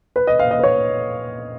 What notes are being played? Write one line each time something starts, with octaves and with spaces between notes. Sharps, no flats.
B4
D#5
F5
D#5
B4
C#5